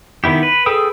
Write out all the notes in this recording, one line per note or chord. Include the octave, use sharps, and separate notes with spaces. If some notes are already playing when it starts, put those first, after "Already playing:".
D#3 B3 E4 G4
B4
G#4 A4 B4 G5 D#6